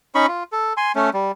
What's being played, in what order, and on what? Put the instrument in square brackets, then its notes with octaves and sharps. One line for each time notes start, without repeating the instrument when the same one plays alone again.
[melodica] C#4 D#4 B5 C#6
F4
A4
G#5 C6
A3 C#4
G3